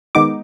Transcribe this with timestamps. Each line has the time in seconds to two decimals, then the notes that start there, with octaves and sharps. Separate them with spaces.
0.15 D#3 G#3 B3 D#4 D6